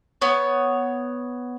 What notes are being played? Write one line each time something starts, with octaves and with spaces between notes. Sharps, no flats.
B3 C#5